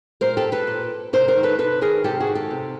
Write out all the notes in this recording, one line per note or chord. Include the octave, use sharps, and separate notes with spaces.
A#2 A#4 C5
G4 A4
A4 B4
A#2
C3 A#4 C5
A#4 C5
D#3
A4 B4
C3 A4 B4
D#3 G#4 A#4
C3 G4 A4
F#4 G#4
D#3
G4 A4
C3